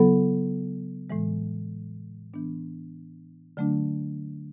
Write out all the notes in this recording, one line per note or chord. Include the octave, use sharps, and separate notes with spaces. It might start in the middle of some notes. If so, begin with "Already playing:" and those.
Already playing: C#3 F#3 B3 E4 A4
A2 E3 G#3
E3 B3 D4
D3 F#3 A3 D4